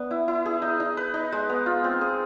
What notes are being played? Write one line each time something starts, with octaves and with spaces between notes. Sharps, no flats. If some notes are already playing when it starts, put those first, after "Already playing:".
Already playing: B3 D4
E4
E4
G#4
D#4
D#4
B4
D#4
G#3
B3
F4
C4
G#4